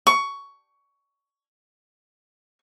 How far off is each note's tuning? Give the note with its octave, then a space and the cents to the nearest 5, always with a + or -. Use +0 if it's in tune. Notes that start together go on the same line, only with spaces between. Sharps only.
C#6 +15